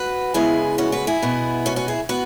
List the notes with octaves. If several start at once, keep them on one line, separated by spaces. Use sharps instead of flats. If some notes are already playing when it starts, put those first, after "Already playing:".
Already playing: F#4 B4
C#3 G#3 B3 E4 G#4
C#4 F#4
F#4 B4
E4 G#4
B2 B3
C#4 F#4
C#4 F#4
E4 G#4
B3 F#4 B4